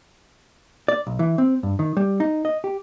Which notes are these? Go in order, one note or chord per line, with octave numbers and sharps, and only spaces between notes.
D5
B1
E3
C4
G2
D#3
G3
D#4
D#5
G4